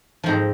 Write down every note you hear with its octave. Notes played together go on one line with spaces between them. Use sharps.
G#2 F3 C4 A#5